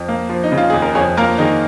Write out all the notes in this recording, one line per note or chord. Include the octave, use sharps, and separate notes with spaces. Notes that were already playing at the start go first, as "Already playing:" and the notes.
Already playing: F2
A#3
F3
D#4
C#3
F4
D#2 G#4
A#4
F2 G#4 C#5
A#3 F4 A#4
D#3 D#4 G#4